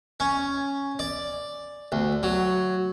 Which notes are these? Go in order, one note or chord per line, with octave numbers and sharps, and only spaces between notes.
C#4
D5
D2
F#3